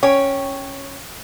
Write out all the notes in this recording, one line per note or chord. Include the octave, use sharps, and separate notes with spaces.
C#4 C#5 G5